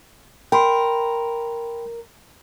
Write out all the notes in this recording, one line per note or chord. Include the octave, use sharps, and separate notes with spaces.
A#4 G5 B5 C6